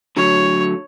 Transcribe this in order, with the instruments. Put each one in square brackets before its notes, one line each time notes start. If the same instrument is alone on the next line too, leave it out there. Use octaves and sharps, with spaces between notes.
[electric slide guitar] D3 F#3 A3 [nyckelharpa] C#5